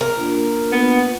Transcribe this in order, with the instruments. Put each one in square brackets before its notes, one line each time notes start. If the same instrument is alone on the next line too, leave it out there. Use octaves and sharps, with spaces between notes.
[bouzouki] A#4
[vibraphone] A#3 D4 F4
[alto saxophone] B3